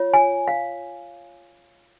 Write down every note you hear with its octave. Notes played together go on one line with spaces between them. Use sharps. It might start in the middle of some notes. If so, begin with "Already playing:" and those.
Already playing: F4 C#5
G#5
F5